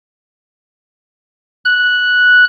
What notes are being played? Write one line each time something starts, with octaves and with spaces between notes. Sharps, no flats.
F#6